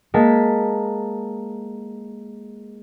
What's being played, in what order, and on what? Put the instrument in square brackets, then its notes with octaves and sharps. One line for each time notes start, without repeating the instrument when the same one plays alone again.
[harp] G#3 A#3 A5 B6